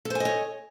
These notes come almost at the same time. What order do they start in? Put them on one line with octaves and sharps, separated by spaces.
A4 C5 G#5 D#5 C#5